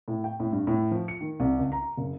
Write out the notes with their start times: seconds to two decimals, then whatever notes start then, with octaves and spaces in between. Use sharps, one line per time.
0.08 A2
0.24 G5
0.40 A2
0.52 G2
0.67 A2
0.91 F3
1.08 C#7
1.21 D#3
1.40 C2
1.59 C#2
1.72 A#5
1.97 F#1